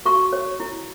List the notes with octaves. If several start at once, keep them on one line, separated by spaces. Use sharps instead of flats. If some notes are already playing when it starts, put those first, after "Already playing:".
F#4 C#6
C#5
E4